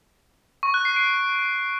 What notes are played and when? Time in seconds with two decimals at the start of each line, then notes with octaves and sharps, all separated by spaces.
0.63 C#6
0.74 F#6
0.85 C7
0.96 D7